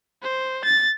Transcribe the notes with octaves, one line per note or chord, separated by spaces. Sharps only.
C5
A6